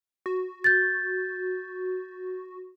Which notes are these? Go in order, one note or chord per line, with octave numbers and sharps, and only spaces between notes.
F#4
G6 A6